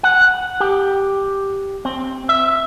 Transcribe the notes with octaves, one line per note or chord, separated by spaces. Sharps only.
F#5
G4
C4
E5